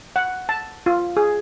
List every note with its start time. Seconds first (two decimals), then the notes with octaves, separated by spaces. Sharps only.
0.16 F#5
0.49 A5
0.86 F4
1.17 G#4